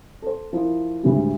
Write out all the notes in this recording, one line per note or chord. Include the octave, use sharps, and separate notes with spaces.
A4 C5
F3 E4 A#4
D2 A2 G3 G#3